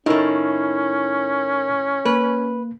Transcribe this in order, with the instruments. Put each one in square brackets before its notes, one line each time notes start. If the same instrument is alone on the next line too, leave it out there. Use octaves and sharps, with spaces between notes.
[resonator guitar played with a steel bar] A2 D#3 [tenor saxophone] C#4 [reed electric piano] D#4 E4 A#4
[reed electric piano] A#3 [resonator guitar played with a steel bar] B4